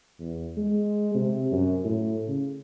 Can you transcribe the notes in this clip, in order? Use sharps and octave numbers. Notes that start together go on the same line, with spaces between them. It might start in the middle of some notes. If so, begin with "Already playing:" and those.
E2
G#3
C3
F#2
A2
C#3